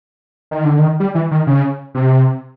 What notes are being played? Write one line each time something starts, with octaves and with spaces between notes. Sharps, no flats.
D#3
D3
D#3
G3
E3
D#3
C#3
C3